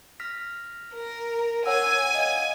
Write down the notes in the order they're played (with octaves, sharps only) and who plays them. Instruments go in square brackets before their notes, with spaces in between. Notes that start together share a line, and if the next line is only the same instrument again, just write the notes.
[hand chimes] F6 A#6 B6
[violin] A#4
[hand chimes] C#5 F#5 E6 [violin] G#5
[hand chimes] D#5 F5